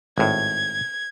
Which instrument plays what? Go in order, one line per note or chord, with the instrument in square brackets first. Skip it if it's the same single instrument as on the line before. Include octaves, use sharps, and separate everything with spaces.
[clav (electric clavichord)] G#1 A2 [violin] G#6